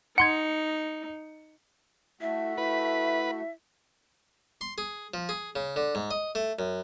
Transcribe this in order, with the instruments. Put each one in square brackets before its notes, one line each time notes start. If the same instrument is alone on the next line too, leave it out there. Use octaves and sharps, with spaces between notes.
[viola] D#4 [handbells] F#5 C6 G#6 [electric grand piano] C#7
[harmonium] A3 F#4 [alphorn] E4 [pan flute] E5
[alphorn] E4 [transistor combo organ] B4
[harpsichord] C6
G#4
F3
G#4
C#3
D3
G#2
D#5
A3
F#2